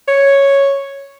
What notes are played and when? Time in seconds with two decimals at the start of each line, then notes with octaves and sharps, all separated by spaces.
0.08 C#5